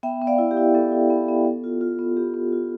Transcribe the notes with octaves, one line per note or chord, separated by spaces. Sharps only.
B3 E5 G5
B3
D5 F5
E4
G4
E4
B3 A4
E4
B3
B3
B3
F4
F4
B3
B3 G4
B3
F4